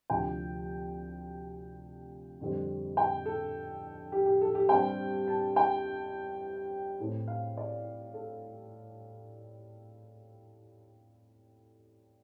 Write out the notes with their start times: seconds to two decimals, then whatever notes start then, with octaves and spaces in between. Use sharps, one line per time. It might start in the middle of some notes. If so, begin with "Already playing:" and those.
0.10 D2 C3 F3 G5
2.40 F2 D3 G3 C4
2.97 G5
3.26 A4
4.12 G4
4.26 G4
4.42 A4
4.55 G4
4.69 G2 G3 C4 G5
5.28 A5
5.56 G5
7.00 A2 A3 C4
7.28 F5
7.57 D5
8.14 A4